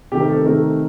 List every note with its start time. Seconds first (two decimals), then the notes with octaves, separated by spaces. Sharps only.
0.12 C3 D#3 A3 G4
0.21 A#4
0.29 A4
0.46 C3 D#3 A3 A#4